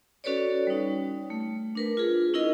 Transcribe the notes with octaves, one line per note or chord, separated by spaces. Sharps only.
C#4 F#4 A4 B4 C#5 D5
G3 D#4
A3
D4 A#4 B4
F4 G#4
C#4 D#4 E4 G#4 A#4 D#5